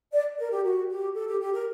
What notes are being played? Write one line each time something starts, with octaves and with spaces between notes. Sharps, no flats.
D5
A#4
G4
F#4
G4
A4
G4
G4
A#4